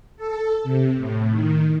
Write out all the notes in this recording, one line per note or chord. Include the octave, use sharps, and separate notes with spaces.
A4
C3
A2
D#3